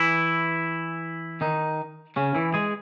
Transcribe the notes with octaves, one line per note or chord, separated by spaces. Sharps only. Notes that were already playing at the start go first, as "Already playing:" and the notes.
Already playing: E3 E4
D#3 D#4
C#3 C#4
E3 E4
G#3 G#4